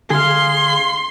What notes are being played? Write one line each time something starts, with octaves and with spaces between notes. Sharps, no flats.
D3 G#4 F5 C6